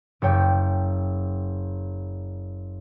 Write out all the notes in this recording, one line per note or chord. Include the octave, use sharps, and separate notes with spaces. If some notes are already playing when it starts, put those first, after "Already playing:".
F#1 C#5 G5